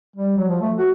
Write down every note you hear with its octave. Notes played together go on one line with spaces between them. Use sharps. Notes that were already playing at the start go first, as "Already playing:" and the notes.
G3
F#3
F3
A3
F#4